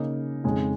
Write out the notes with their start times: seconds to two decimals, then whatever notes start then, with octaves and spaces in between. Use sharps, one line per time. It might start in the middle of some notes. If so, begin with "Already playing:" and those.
Already playing: C#3 A#3 D#4
0.44 F2 C#3 G#3 D#4